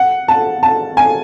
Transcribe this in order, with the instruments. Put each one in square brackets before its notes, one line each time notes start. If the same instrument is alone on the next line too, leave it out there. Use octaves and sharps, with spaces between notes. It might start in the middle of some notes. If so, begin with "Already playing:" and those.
Already playing: [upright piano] F#5
A5
A5
G#5